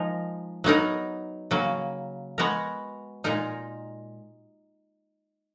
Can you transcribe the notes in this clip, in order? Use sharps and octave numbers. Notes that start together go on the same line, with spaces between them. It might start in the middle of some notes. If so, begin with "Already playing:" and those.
Already playing: F3 G#3 D#4 A#4
F#3 B3 D#4 A#4
C#3 F#3 A#3
G#3 B3 F#4 A#4
A#2 G#3 D#4 A#4